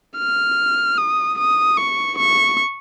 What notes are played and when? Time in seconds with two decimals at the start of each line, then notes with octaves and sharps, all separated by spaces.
0.18 F6
0.98 D#6
1.38 D#6
1.78 C#6
2.18 C#6